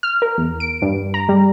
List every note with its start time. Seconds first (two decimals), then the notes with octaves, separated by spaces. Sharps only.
0.03 F6
0.22 A#4
0.38 E2
0.60 D7
0.82 G2
1.14 A#5
1.29 G3